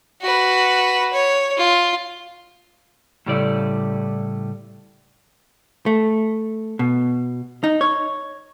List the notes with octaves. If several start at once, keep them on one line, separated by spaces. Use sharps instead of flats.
F#4 B4
C#5
F4
A2 C#3 G3 A3 E4 D5
A3
B2
D#4
C#5